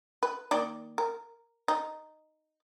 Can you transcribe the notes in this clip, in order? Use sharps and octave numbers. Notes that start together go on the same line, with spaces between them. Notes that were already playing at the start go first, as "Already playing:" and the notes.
B4
D#3 A#3 D5
A#4
D#4